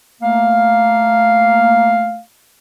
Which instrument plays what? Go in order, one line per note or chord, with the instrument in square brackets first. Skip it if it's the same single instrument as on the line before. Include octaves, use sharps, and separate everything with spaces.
[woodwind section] A3 A#3 F5